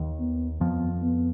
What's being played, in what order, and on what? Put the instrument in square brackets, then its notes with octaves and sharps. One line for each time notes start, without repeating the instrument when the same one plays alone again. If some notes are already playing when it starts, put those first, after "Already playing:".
Already playing: [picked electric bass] D#2 D#3
[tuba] B3
[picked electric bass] F2 F3 [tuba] B3
[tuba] B3